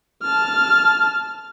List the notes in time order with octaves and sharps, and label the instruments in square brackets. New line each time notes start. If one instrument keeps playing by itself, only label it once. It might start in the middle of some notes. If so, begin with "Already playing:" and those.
[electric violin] A5 F6